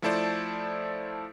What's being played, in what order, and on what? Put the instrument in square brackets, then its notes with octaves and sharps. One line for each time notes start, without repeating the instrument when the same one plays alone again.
[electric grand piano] F3 A3 E4 A4 C5 D5